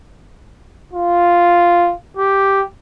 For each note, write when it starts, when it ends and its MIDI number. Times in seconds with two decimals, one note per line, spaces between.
0.93 1.94 65
2.17 2.63 67